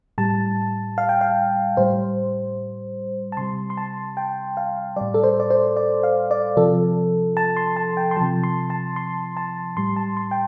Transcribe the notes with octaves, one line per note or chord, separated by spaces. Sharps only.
A2 G3 A5
F5
G5
F5
A2 G3 C5
A5
C3 G3 C6
C6
A5
G5
F5
A2 G3 D5
A4
C5
D5
C5
D5
F5
D5
C3 F3 A4
A5
C6
A5
G5
C6
C3 F3 A5
C6
A5
C6
A5
A2 G3 C6
A5
C6
G5